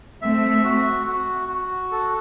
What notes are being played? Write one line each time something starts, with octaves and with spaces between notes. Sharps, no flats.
A3 C4 E5
F#4
F#4
F#4
A4